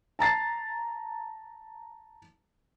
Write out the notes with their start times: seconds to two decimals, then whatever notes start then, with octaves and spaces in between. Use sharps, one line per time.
0.19 A5 A#5 A6 C7